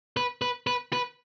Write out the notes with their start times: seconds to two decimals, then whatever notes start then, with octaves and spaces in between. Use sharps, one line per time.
0.17 B4
0.42 B4
0.67 B4
0.93 B4